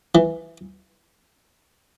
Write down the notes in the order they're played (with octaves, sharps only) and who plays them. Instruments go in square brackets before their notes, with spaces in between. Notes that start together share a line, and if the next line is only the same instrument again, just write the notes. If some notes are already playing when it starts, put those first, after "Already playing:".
[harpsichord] E3